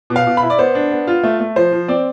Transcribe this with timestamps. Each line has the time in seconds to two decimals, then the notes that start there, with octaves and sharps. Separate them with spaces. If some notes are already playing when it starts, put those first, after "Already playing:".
0.10 B2
0.16 F5
0.27 B2
0.37 B5
0.43 E4
0.50 D5
0.58 B3 C5
0.75 D4
0.91 B3
1.07 F4
1.24 A3
1.40 A3
1.56 F3 C5
1.72 F3
1.88 C4 D5